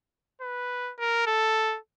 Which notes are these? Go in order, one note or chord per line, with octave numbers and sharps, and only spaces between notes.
B4
A#4
A4